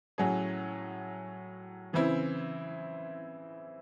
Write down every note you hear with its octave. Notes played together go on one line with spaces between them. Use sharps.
A2 F#3 C#4 G#4
C#3 E3 C4 E4